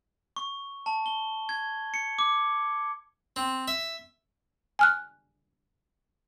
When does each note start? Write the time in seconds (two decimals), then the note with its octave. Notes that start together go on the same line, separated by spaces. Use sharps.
0.36 C#6
0.86 A5
1.06 G7
1.49 G#6
1.94 C#7
2.19 D6
3.36 C4
3.68 E5
4.79 G#5 F6 F#6